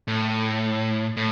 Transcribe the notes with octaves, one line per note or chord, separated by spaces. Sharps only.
A2
A2